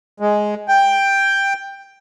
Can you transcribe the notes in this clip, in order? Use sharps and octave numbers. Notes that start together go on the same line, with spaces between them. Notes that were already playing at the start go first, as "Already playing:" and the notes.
G#3
G5